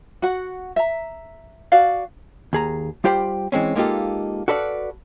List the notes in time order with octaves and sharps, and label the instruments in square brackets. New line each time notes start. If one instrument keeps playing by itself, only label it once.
[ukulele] F#4 F#5
E5 A#5
F#4 D5 F5
[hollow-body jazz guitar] D#2 G#4 A#5
G3 F4 G4 C5 G5 B5
E3 G#3 C4 C#4
G#3 A#3 D#4 F4 G4 A4
F#4 A4 B4 D5 D#5 F5